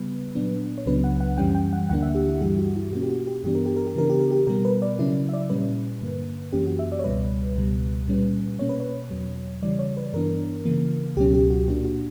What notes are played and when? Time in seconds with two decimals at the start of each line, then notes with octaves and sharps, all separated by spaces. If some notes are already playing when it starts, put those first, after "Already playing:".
Already playing: C#3 G3 B3 B4
0.35 A#2 F#3 B3 D4
0.78 C#5
0.86 C#2 C#3 F#3 B3 D4 B4
1.04 F#5
1.20 F#5
1.38 F#2 E3 G3 C#4 G5
1.55 G5
1.73 F#5
1.89 D2 D3 A#3 D4 F#5
2.02 E5
2.15 G4
2.28 E4
2.41 G2 E3 G3 G4
2.58 F#4
2.76 E4
2.92 B2 A#3 C#4 F#4
3.03 G4
3.09 F#4
3.27 G4
3.43 G2 E3 B3 D4 G4
3.55 A#4
3.66 G4
3.76 A#4
3.87 G4
3.95 C#3 E3 B3 D4 A#4
4.10 G4
4.20 A#4
4.31 G4
4.47 B2 G3 B3 A#4
4.65 B4
4.82 D5
4.99 C#3 F#3 C#4 E4
5.29 E5
5.33 D5
5.50 A#2 G3 C#4 B4
6.02 G2 D3 A#3
6.52 F#2 E3 A#3 C#4 G4
6.66 F#4
6.79 E5
6.92 D5
6.99 C#5
7.04 C#2 B2 G3 B4
7.56 C#2 B2 G3
8.08 A#2 G3 C#4
8.59 B2 A#3 C#4 C#5
8.69 B4
8.80 C#5
9.11 E2 B2 F#3
9.62 C#3 E3 G3 D5
9.79 C#5
9.97 B4
10.13 G2 E3 B3 D4 A#4
10.65 C#3 E3 A#3
11.16 C#2 B2 F#3 C#4 G4
11.34 G4
11.50 F#4
11.68 A#2 A#3 D4 F#4
11.85 F#4